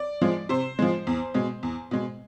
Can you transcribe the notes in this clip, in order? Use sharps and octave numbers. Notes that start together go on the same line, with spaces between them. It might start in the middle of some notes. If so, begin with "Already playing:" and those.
Already playing: D5
F3 G#3
C3 C5
F3 G#3
E2
B2 G#3
E2
B2 G#3